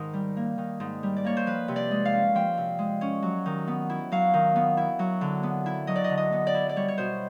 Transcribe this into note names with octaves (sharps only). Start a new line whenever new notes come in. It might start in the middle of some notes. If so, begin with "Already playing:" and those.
Already playing: G#2 D#3
G3
A#3
D#3
G#2
G3
D5
A#3 C#5
C5
F3 B4
C3
D5
G#3
F5
C#4
F3 G5
C3
G#3
C#4
F#3
D#3
B3
E4
F#3 F5
D#3
B3
E4
F#3
D3
B3
E4
F#3 D#5
D5
D#5
D3
D#5
B3
D5
E4
D5
G3 C#5
C#5
B2 C5